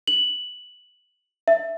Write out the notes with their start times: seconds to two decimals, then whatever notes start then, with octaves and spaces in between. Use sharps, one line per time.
0.07 F#7
1.48 E5